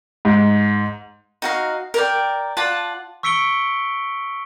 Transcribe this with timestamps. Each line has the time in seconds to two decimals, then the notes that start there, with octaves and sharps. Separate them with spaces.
0.25 G#2
1.42 D#4 F#4 F5
1.94 A#4 D5 G5
2.57 F4 D5 F#5 A5
3.23 C#6 E6 B6 C#7 D7 G7